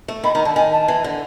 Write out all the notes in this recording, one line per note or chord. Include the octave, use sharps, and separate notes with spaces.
A3
D#3 B5
D#3 A#5
D3 A5
D#3 G#5
A5
E3
D3